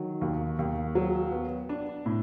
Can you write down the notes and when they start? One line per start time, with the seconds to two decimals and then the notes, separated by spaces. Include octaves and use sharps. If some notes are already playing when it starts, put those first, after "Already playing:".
Already playing: D#3 F#3
0.21 D#2
0.59 D#2
0.95 F#3
1.32 B3
1.69 D4
2.06 A2